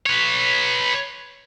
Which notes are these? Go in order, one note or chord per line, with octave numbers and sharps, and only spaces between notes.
B4 C#5